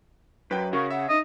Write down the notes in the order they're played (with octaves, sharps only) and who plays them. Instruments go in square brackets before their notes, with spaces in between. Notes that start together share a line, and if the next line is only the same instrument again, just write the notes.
[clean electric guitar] F#2 [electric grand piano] B4 G5
[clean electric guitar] C#3 [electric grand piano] F#4 A#4 F5 [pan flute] C#6
[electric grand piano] E5 [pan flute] F#5
[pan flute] D#4 [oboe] D#5